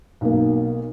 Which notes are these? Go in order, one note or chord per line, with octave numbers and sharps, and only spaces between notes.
B1 A#3